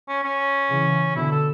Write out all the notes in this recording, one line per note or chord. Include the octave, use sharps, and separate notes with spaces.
C#4
C#4
C#3 E3
B2 D3 E4
A4